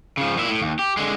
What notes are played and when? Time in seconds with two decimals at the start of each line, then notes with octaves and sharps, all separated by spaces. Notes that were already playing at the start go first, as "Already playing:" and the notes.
0.17 C#3 F3
0.37 A#2 E4
0.49 A2
0.62 D#2
0.79 G4
0.97 D3 G#3